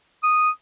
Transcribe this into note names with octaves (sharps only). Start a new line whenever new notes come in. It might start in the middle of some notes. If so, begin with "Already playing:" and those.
D#6